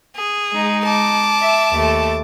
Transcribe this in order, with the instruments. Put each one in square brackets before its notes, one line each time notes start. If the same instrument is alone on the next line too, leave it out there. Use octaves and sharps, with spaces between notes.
[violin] G#4
[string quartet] G#3 D#4
[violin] A5 D6
[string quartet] E5
D#2 A3